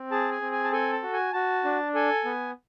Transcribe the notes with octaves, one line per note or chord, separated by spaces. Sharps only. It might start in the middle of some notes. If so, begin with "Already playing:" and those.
Already playing: C4
G#4 A5
G#5
C4
G#5
A5
A4 G#5
A5
F#4
G#5
F#4 A5
D4
A4 G#5
B3